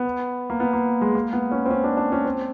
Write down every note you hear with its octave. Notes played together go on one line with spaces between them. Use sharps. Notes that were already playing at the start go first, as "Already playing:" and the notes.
Already playing: B3
A#3
B3
A#3
G#3
A#3
B3
C#4
C4
C#4
D4
D4
C#4
C4